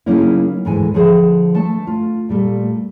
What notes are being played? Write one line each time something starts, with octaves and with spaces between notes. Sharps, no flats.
C#3 F#3 A#3 C#4 D#4 E4
D2 G#2 E3 G#5
D3 F3 G#4 C5
A3 A5
F4
A#2 G3 A3